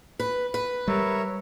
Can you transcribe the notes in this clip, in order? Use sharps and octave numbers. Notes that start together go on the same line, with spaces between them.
B4
B4
G3 A#4 C#5 E5